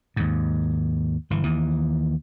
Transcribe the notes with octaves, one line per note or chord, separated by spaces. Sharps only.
D#2 G#2
G1 E3
D#2 E3